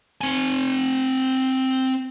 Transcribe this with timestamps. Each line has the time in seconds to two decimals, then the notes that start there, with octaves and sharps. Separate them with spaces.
0.21 C4 G#5